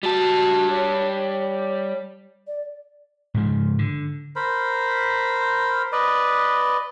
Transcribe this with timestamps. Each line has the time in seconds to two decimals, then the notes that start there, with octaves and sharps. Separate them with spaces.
0.03 G3 F#4 A5
0.70 C#5
2.47 D5
3.34 G#2 C#3 F3
3.79 D3
4.36 A#4 C5 B5
5.92 B4 D5 D#5